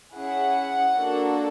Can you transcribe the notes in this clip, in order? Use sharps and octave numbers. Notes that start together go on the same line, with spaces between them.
C#4 E4 G#4 F#5
A#3 D4 F#4 A4